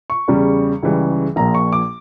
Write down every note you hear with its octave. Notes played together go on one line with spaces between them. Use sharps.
C#6
E2 C#3 G3
C#2 C#3 E3 G3
A#1 A#2 F3 A#5
C#6
D6